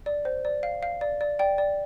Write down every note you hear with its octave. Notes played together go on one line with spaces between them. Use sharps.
D5
C5
D5
F5
F5
D5
D5
D5 G5
D5